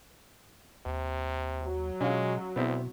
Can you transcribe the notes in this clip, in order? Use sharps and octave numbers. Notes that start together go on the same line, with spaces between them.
D#2 C3
F#3
B2 G#3 C#4 F4
D2 B2 B3 C4 E4